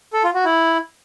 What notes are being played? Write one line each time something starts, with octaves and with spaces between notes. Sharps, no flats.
A4
F4
F#4
E4